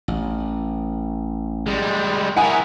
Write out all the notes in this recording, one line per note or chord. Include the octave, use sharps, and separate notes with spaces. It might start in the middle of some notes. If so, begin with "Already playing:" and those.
A1
G3 G#3
E4 A#4 F#5 G#5 D#6